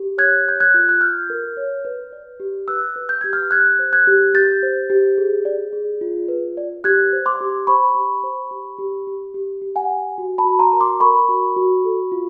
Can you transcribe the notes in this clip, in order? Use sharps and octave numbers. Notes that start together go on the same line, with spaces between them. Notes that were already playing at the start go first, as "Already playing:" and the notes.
Already playing: G4
C#5 F#6 G#6
C#5 G6
F#6 G#6
F4
F#6
F4 F6 G6
A#4
C#5
B4
D5
G4
B4 E6 F#6
B4
G6
G4 G#6
F6 G6
G4 F#6 G#6
C5
F#6 G#6
G4
G4 G6 A6
C5
G4
G#4
D5
G#4
F4
B4
D5
G4 F#6 G#6
C5
C6 D6
G4
C5 B5 C#6
G4
C5
G4
G4
G4
G4
G4
F#5 G#5
G4
F#4
A5 B5
F#4
A#5 C6
A#4
C6 D6
A#4 B5 C#6
F#4
F#4
A4
F4